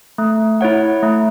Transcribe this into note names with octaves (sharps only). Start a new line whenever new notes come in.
A3
E4 C#5 F#5
A3